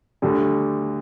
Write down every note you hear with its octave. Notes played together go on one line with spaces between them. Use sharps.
D2 D3 G3